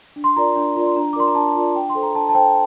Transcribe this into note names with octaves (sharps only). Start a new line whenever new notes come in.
D4
C6
F4 A#4 D5 A#5
D4 C6
F4 A#4 D5
C6
D4 A#5
D6
F4 A#4 D5 C6
A#5
D4 A5
F4 A#4 D5
D4 G5
C6
A4 C5
A#5
D4 A5
A5
A4 C5 G5